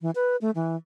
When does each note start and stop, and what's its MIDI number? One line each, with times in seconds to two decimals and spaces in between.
0.02 0.11 52
0.15 0.36 71
0.41 0.51 57
0.55 0.76 52